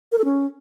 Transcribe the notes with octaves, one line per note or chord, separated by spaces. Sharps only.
A#4
A4
C#4